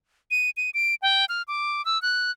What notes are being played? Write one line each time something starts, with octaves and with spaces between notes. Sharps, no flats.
D#7
D#7
D7
G5
F6
D6
E6
F#6